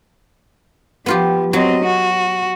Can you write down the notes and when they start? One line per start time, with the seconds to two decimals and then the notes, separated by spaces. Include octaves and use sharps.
1.06 F3 B3 F4 G4
1.53 F#3 C4 D#5
1.85 F#4